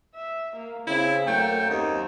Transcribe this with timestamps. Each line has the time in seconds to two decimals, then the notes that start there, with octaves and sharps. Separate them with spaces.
0.15 E5
0.57 A#3
0.87 C#3 C4 E4
1.27 F#2 A3 A#3 G5
1.70 D#2 C4 D#4